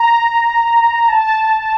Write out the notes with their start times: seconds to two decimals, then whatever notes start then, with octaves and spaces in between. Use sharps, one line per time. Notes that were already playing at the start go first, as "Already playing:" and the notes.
Already playing: A#5
1.08 A5